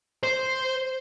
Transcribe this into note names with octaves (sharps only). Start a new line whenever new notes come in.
C5